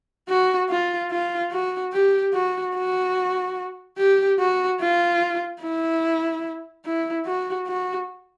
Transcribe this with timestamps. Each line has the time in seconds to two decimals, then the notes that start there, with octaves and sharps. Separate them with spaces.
0.29 F#4
0.70 F4
1.11 F4
1.52 F#4
1.93 G4
2.34 F#4
2.74 F#4
3.98 G4
4.39 F#4
4.81 F4
5.62 E4
6.85 E4
7.26 F#4
7.67 F#4